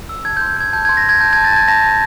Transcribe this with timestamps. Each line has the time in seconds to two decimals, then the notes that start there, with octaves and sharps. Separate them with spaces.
0.09 E6
0.25 A5 G#6
0.37 C6 G6
0.57 G6 G#6
0.73 A5 G6
0.85 C6 G#6
0.97 A#6
1.04 C6 G#6
1.21 A5 G6
1.33 A5 G#6
1.45 A6
1.53 A5 G#6
1.68 A5 A#6
1.84 A5